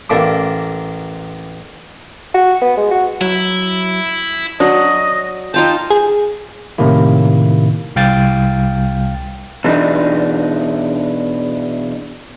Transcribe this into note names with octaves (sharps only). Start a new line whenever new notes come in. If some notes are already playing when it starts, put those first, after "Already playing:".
A1 A#3 A4 D6
F#4
B3
G#3
F#4
F#3 E4
F#3 D4 D#5
D#4 F4 G5 A5
G#4
A2 C3 D#3 A#3 E4
C2 F5 G5 A6
B2 E3 D4 D#4